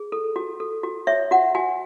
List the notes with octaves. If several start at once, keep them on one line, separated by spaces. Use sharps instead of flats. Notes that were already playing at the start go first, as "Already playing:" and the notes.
Already playing: G#4
A4
F#4
A4
F#4
C#5 E5
F#4 F#5
F#4 G#5